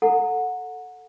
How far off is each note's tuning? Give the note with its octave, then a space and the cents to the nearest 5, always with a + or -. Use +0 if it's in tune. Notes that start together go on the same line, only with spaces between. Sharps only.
A4 +5 F#5 -20 A#5 -25